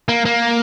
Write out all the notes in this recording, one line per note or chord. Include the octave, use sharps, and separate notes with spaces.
A#3
A#3